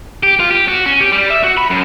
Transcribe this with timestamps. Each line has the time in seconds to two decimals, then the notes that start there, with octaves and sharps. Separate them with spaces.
0.23 G4
0.40 F4
0.51 G4
0.68 F#4
0.86 C#4
1.00 G4
1.12 G3
1.30 E5
1.43 F#4
1.57 B5
1.70 F#2